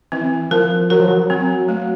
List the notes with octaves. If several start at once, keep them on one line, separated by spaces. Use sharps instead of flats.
E3 C4
F3 A#4
F#3 A#4
F3
F#3
F#3 C4
A3